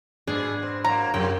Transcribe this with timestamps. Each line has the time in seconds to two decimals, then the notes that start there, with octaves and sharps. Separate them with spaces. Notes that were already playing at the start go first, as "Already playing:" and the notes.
0.27 G#2 B2 D4 G#4
0.62 C4
0.84 F#3 A#3 A#5
1.14 F#2 C3 F#3 G5